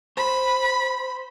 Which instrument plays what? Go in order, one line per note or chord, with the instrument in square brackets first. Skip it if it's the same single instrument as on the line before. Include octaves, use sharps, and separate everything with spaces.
[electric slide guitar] C5 [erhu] B5